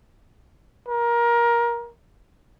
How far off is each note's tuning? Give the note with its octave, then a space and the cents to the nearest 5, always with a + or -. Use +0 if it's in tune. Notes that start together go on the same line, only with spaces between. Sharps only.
A#4 +20